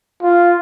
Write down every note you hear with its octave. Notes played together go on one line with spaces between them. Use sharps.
F4